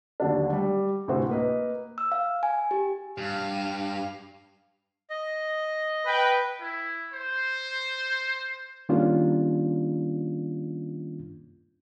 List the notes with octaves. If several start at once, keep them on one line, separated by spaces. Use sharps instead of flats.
D#2 D3 F#3 D4
G3
D2 A2 C3 E4 F#4 C5
A#3 B4 D#5
E6
F5
G#5
G4
G2 F5
D#5
B4 G5
E4
C5
D#3 G3 A#3 C#4 D4 F4